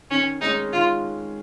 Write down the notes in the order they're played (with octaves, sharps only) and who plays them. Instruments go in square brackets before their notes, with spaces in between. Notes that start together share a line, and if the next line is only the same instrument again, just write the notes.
[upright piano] D#3 [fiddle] C#4
[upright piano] G#3 C#4 [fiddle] D#4
[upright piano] D#3 [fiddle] F4